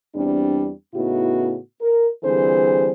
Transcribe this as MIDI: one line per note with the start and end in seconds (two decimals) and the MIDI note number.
0.15 0.71 40
0.15 0.71 55
0.15 0.71 60
0.15 0.71 62
0.94 1.58 45
0.94 1.58 49
0.94 1.58 59
0.94 1.58 63
0.94 1.58 64
0.94 1.58 66
1.81 2.07 70
2.23 2.92 50
2.23 2.92 52
2.23 2.92 55
2.23 2.92 60
2.23 2.92 68
2.23 2.92 72